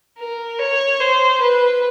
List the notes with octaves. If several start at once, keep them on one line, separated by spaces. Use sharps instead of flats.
A#4
C#5
C5
B4